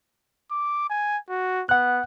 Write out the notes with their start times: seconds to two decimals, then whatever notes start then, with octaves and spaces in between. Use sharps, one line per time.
0.51 D6
0.90 G#5
1.29 F#4
1.69 B3 F#5 F#6